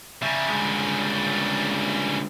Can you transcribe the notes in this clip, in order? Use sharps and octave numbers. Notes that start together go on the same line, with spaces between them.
C#3 G3 E5
D3 G#3